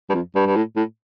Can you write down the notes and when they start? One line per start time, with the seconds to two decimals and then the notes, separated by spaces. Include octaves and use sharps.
0.10 G2
0.14 F2
0.35 G2
0.46 G2
0.56 A2
0.76 A2